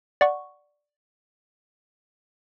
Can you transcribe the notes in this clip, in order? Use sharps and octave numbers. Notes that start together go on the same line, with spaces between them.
D5 F#5 C#6